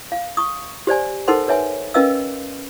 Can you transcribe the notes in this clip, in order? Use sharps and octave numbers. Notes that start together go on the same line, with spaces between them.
F5
C#6 D#6
G4 C5 D5 G#5
D#4 A4 A#4 C5 F#5 C6
B4 C#5 E5 G#5
C#4 A#4 B4 D#5 F5 E6